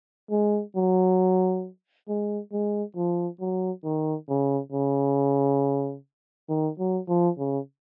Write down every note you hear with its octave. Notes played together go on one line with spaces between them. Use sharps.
G#3
F#3
G#3
G#3
F3
F#3
D#3
C#3
C#3
D#3
F#3
F3
C#3